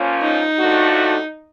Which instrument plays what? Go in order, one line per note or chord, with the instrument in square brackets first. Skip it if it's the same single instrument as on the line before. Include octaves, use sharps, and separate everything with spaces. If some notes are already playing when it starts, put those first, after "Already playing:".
Already playing: [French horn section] A#2 F3 A#3 C#4 F4
[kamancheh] D#4
[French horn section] A2 F3 A3 D4 F#4